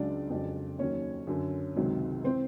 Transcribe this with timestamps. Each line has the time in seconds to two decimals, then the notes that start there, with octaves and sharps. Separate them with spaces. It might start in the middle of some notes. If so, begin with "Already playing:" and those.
Already playing: C#2 C#3 F#3 D4 D5
0.30 F2 C#3 F#3
0.78 D#2 D#3 F#3 C#4 C#5
1.27 F#2 D3 F#3
1.76 C#2 C3 D#3 F#3
2.24 E3 C4 C5